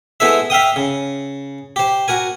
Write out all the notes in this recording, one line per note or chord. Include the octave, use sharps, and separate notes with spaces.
G#3 B3 E4 A4 C5 E5
E5 F5 G5 D#6
C#3
G4 C5
F#4 A#4 G#5